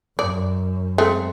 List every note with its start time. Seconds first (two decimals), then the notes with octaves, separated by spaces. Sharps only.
0.19 F#2 D5
0.98 G#3 A3 C4